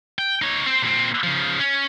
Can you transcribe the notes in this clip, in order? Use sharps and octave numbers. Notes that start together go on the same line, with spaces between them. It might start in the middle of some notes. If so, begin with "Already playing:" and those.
G5
D#4 C#5
C4 C5
A#2 C4
C#3 F3
C#4